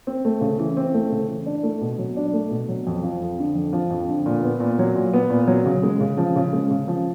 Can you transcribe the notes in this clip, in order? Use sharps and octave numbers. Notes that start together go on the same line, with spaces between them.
C4
A3
C#3
E3
C4
A3
C#3
E3
D4
A3
B2
F#3
D4
A3
B2
F#3
F2
F3
F2
D3
F2
F3
F2
D3
A#2
B3
A#2
F#3
A#2
B3
A#2
F#3
C#3
G#3
C#3
F3
C#3
G#3
C#3
F3